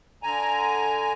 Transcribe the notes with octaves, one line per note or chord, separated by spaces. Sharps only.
D3 G#5 A#5